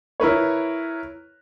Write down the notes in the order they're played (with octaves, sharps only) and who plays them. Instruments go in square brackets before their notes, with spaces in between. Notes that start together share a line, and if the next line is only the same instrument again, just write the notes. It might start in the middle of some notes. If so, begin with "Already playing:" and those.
[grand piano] E4 A#4 B4 C#5